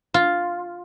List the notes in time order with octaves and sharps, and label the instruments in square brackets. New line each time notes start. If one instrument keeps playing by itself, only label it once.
[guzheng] F4